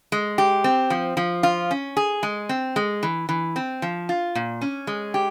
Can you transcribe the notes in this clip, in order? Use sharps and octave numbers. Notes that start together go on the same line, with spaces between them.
G#3
G4
C4
F3
F3
F4
C#4
G#4
G#3
C4
G#3
E3
E3
C4
F3
F4
A#2
C#4
G#3
G4